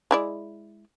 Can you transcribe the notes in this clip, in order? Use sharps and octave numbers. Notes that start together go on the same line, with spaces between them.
G#3 E4 D5